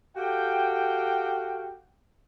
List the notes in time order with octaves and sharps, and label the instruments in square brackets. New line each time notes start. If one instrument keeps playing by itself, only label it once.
[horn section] F#4 G4 A4 F5 G5